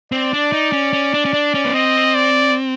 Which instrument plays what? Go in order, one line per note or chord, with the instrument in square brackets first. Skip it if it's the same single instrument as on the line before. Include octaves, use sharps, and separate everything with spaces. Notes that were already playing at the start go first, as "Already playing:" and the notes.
[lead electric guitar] C4 [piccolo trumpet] D5
[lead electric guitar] D4
D#4
C#4
C#4
D4
C#4
D4
C#4
B3
[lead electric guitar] C4 [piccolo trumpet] D#5
[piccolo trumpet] D5